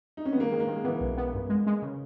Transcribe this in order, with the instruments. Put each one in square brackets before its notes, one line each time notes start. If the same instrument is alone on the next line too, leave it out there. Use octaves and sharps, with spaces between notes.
[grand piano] D#4
C#4
B3
[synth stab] D#3 [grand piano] A#3
[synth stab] D#3 [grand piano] G#3
[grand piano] A#3
[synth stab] D#3 [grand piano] G#3
[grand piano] E3 [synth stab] B3
[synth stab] B1
B3
G2
G#3
G#3
C#3